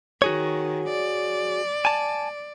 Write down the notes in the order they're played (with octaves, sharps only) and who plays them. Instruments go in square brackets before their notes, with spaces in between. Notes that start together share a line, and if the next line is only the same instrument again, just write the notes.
[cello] D#3 [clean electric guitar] F#4 G#4 C#5
[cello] D5
[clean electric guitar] G#5 A5